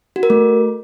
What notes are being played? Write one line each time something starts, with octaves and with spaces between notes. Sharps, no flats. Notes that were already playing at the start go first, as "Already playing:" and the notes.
F#4
A#4
A3